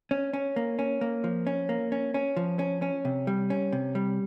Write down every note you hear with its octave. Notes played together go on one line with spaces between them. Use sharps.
C#4
C#4
A#3
C#4
A#3
F3
C#4
A#3
C#4
C#4
F3
C#4
C#4
C3
G3
C#4
C3
G3